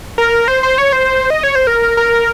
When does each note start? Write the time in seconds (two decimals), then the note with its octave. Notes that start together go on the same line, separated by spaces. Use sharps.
0.18 A#4
0.48 C5
0.63 C5
0.78 C#5
0.93 C5
1.30 D#5
1.43 C#5
1.55 C5
1.67 A#4
1.97 A#4